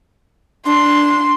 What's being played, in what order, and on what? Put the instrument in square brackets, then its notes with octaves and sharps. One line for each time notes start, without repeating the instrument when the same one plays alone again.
[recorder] D4 [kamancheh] C6